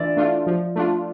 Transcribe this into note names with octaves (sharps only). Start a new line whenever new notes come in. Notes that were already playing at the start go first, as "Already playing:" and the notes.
Already playing: E3 A3 D4 F4 D5 E5
A3 D4 F4
F3
A3 D4 F4